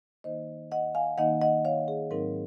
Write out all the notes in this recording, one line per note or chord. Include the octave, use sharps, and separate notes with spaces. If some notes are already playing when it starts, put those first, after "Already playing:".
D#3 A#3 D#4 C5 D#5
D#5 F#5
F5 G#5
D#3 A#3 D#4 D#5 F#5
D#5 F#5
C#5 F5
G#4
G#2 F#3 C4 D#4 A#4